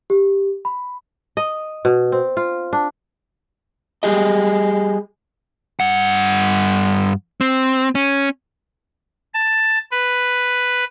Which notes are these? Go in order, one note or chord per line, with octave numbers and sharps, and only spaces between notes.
G4
B5
D#5
B2
C4
F4
D4
G3 G4 G#4 D#5
G2 F#5
C4
C#4
A5
B4